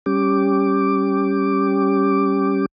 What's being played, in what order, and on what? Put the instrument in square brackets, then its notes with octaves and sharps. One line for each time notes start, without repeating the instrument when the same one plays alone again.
[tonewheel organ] G3 C#4 G4 D6